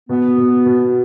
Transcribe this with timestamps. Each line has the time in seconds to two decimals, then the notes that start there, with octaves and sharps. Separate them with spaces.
0.09 B2 B3
0.38 B2
0.66 B2